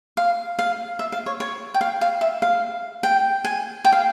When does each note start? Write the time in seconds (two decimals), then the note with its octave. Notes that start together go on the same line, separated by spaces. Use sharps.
0.17 F5
0.59 F5
0.99 E5
1.12 F5
1.26 C#5
1.40 C#5
1.74 G5
1.81 F5
2.01 F5
2.21 E5
2.42 F5
3.03 G5
3.44 G#5
3.85 G5
3.92 F5